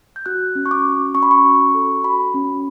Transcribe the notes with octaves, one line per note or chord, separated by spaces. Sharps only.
G6
F#4 F#6
C#4
C#6
D6
F#4
C#4 C#6
B5
C#6
F#4
A4
F#4 B5
C#4